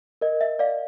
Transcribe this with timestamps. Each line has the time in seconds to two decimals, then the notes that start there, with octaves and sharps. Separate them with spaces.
0.21 A#4 D#5
0.41 E5
0.59 D5 F5